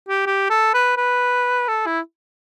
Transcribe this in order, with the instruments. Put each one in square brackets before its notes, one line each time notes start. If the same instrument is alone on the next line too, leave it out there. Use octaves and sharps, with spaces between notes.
[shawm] G4
G4
A4
B4
B4
A4
E4